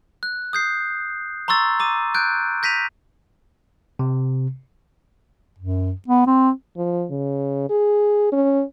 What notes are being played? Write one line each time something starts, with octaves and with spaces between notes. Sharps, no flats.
F#6
D#6 G6 C7
A#5 C6 C#6 E6 A6
A#5 D6 D#7
F#6 G6 D7
G6 A#6 B6 D#7 F7
C3
F#2
B3
C4
F3
C#3
G#4
C#4